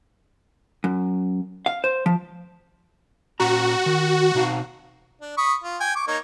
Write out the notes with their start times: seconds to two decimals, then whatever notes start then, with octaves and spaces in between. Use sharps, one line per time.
0.84 F#2
1.66 F5
1.84 C5
2.06 F3
3.40 A#2 C#4 F#4 A#5
3.86 D#3
4.35 B2 D#4 F5
5.21 D4
5.37 B5 C#6 D#6
5.64 F4
5.80 G5 G#5
5.96 C#6 D6
6.07 A#3 D#4 C#5